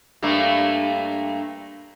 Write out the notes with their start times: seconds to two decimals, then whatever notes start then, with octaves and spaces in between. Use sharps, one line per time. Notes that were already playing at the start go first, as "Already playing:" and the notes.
0.22 G2 A3 A#3